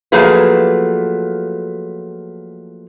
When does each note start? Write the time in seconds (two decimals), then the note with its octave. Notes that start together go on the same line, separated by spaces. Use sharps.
0.12 F3 F#3 A3 A#3 G#4 B4